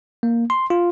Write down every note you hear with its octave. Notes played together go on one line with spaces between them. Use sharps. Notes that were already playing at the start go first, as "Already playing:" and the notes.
A#3
C6
F4